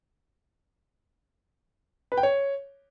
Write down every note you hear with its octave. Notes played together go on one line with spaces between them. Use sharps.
B4
G5
C#5